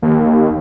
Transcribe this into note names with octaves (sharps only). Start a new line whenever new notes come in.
D#2